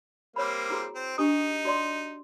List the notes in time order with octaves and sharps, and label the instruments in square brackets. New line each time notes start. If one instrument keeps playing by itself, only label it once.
[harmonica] G3 A#3 C4 [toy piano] C#5 B5
[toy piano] E4 F#4 G#4
[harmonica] C4
[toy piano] D4 G4 D#6 [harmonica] D#4
[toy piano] F#4 D5 C6